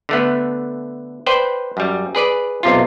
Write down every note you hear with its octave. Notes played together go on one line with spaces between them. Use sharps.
D3 A3 B3
B4 C5 D5 G5
F#2 G3
G#4 B4 D5
B1 C3 F4